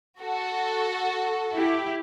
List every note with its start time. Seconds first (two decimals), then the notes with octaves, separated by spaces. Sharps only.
0.22 F#4 A4
1.55 E4 G4